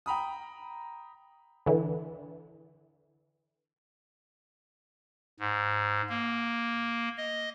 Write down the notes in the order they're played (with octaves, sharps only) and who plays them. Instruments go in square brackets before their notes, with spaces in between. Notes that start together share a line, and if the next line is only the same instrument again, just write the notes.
[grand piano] G5 A#5 B5 D#6
[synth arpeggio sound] D3 E3
[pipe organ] G#2
A#3
D#5